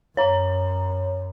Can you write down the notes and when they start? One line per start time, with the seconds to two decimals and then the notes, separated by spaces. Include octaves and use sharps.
0.17 F#2 C#5 A#5